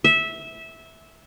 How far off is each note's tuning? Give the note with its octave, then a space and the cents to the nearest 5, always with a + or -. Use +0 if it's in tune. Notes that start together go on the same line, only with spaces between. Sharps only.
E5 -15